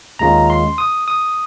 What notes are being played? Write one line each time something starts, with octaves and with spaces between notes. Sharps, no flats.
D#2 D#3 G#3 C#4 F4 A#5
C6
D#6
D#6